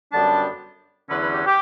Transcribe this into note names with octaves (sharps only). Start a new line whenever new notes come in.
F#2 D3 G3 B3 D4 A5
E2 D3 F#3 C#4 B4
B4
G4
G4